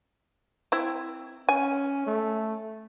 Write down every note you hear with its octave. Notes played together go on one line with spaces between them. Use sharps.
C4 E4
C#4 G#5
A3